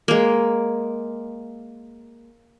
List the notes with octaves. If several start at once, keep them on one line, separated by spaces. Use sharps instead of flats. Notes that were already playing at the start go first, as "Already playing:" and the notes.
G#3 A#3